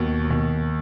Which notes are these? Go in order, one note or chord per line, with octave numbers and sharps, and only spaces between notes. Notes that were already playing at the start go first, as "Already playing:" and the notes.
Already playing: D#2 B2
D#2